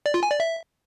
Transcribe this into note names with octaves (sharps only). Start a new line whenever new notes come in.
D5
F4
G#5
D5
E5